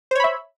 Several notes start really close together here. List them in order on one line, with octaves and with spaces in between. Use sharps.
C5 C#5 B5 E5